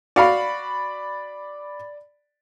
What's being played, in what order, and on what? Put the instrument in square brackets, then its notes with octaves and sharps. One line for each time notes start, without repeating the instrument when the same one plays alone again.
[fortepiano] F#4 F5 [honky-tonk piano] D5 B5